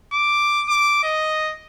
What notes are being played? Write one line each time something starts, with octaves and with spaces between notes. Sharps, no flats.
D6
D6
D#5